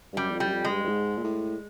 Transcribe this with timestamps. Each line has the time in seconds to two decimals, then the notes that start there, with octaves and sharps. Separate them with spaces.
0.12 G2
0.17 F#2 G3
0.30 E2
0.34 F2
0.40 G3
0.46 F#2
0.52 F2
0.65 G#3
0.70 G2
0.84 G2
0.88 G#2
1.18 A#2
1.24 A2